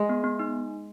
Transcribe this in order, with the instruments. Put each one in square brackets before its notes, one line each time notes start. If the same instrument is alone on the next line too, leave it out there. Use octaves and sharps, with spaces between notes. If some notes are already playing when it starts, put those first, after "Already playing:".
Already playing: [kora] G#3
[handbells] B3
B3
D#4